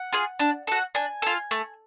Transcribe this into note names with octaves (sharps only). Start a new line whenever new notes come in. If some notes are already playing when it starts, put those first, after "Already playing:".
Already playing: F#5
F4 G#4
D4
F#4 A4
D4 G#5
F4 A4
A3